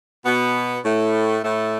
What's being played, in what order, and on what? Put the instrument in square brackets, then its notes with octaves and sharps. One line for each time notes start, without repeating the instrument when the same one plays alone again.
[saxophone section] B2 B3
A2 A3
A2 A3